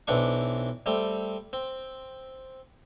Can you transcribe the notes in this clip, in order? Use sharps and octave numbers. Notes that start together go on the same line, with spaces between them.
B1 E3 C4 D4 C#6
G3 A3 C4
C4